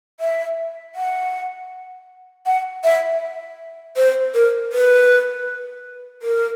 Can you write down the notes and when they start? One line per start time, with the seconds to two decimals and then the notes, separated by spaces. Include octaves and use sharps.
0.20 E5
0.95 F#5
2.46 F#5
2.84 E5
3.96 C5
4.34 A#4
4.72 B4
6.22 A#4